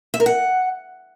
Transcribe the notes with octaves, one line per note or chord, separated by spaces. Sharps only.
E5
A#4
F#5